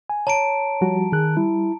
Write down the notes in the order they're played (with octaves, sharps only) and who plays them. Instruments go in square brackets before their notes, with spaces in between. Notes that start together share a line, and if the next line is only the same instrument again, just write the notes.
[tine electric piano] G#5
[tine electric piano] C#5 [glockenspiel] A5 A#5 D7
[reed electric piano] F3 G3 F#4
[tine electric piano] D#3 F#6 [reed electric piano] G#4
[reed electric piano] G3 [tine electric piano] E4